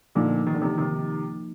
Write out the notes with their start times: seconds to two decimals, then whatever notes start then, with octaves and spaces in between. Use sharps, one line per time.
0.15 A#2 D3 F3 A#3 D#4
0.47 D#3
0.54 D3
0.62 C3 D#3
0.78 C3 D#3